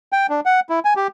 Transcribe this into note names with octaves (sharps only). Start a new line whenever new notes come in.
G5
D4
F#5
E4
G#5
G4